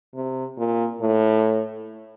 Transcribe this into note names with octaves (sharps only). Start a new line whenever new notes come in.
C3
A#2
A2